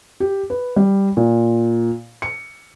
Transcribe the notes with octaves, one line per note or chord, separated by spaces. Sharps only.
G4
B4
G3
A#2
C#7